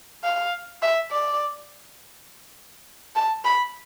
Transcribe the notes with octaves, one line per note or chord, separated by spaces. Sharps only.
F5
E5
D5
A5
B5